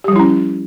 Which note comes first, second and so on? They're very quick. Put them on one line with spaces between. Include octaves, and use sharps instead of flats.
G4 G3 F3 E4 C#4